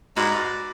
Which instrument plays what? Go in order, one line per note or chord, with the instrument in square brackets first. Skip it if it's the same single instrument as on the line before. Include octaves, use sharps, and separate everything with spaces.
[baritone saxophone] G#2 [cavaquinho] D#4 F#4 B4 D5